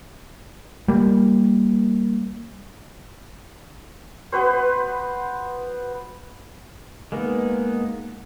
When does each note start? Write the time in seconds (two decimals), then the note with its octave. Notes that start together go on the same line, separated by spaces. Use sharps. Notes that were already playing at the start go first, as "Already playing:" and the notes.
0.88 G3 A#3
4.32 B3 F#4 B4 C5
7.12 G#3 A#3 B3 D#4